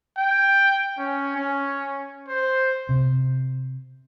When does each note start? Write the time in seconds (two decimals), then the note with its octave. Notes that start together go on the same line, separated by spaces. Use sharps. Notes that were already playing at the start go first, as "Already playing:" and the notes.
0.17 G5
0.98 C#4
1.36 C#4
2.28 C5
2.89 C3